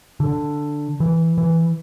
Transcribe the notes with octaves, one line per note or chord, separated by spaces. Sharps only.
D3
E3
E3